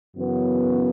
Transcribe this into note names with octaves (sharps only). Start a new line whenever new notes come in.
F#2 C#3 E3 B3